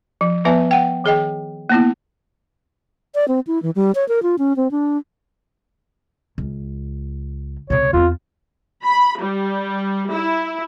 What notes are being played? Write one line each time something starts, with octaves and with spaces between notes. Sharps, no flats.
F3
F3 B3 B4 E5 G#5
F#5 G5
D#3 G#4 D#5 G5
A#3 B3 E4
D5
C4
E4
E3
G3
C#5
A#4
F4
C#4
C4
D4
C#2
C#2 C3 C#5
E2 C4 F4
B5
G3
E4